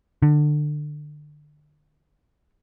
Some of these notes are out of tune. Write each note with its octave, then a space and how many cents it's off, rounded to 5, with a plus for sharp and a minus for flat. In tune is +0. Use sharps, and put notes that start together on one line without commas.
D3 +25